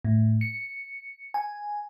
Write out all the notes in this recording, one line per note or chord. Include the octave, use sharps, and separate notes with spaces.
A2
C#7
G#5